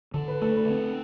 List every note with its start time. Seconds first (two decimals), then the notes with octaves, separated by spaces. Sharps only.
0.14 D3 A4
0.28 B4
0.42 A3 A4
0.56 B4
0.70 C4